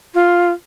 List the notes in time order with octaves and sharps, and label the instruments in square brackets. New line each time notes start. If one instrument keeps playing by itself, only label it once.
[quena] F4